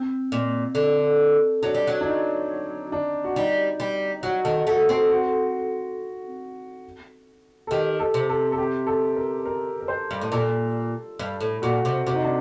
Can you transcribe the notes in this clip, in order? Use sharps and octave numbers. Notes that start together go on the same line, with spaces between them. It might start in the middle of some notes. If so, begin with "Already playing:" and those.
Already playing: C4
A#2
D3
F#3 D4
G3
F#3
D4
D#4
D4
F#4
G3 D#4
G3
F#3 F#4
D#3 A4
A3 F#4
C4 F#4
F#4
A4
D#3 G4
A4
C3
A4
A4
G4
A4
A#4
A#4
A#4
C5
G2
A2
A#2 A4
G2
A2
A#2 F#4
C3
C3 F#4
D#4
D4